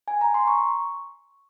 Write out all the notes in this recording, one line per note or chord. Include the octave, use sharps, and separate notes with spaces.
G#5
A#5
C6
C#6